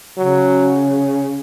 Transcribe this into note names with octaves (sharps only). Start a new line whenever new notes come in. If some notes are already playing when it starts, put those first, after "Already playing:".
C#3 F#3